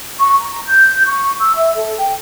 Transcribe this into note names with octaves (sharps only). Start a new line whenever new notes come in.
C#6
A#5
G6
C#6
E6
E5
A4
G5